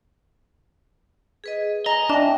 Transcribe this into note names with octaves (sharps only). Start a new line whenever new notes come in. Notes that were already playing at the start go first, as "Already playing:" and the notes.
G#4 B4 D#5
D#5 G#5 A#5
D4 E5 G5 A5